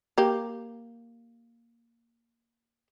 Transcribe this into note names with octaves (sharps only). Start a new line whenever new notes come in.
A#3 G4